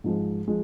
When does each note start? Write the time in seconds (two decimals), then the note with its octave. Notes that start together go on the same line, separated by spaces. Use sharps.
0.04 G#2 F3 G#3
0.48 F3 G#3